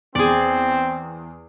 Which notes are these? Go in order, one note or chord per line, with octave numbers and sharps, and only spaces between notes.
E2 C4 G#4 D5